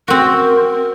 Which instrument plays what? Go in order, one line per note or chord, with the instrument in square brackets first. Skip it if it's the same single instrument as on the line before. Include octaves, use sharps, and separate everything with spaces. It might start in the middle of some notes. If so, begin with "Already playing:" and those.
[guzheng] C4 F#4 [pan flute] A#4